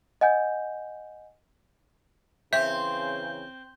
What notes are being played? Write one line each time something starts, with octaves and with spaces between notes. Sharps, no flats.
D#5 F#5 G#5 G6
C#3 E3 C4 E5 G6